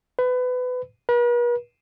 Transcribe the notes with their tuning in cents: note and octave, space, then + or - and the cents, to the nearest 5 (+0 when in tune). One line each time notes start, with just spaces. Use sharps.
B4 +25
B4 -45